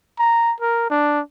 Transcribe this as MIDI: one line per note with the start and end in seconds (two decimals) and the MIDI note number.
0.19 0.53 82
0.61 0.89 70
0.90 1.20 62